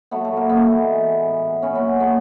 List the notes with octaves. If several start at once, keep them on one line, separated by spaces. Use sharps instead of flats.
F#3 A3 B3
A#2 A3
A#3
F#3 A3 B3
E3
G#3
E3
A2
A2
A2
A#2 B3 C#4
F#3 B3 C#4
A#2 A3 B3